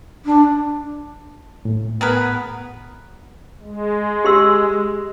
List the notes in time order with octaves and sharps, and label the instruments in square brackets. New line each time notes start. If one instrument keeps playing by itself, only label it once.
[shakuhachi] D4
[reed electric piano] A2
[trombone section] B3 [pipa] G#4 A#4 B4
[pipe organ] G#3
[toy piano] G4 C6 E6